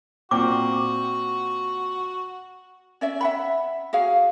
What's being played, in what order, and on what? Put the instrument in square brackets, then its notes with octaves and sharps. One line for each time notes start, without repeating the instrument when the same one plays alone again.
[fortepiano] A#2 C4 G5 [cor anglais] F#4 [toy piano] D6
[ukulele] C#4 D5 E5
E5 F#5 B5
F#4 G#4 F5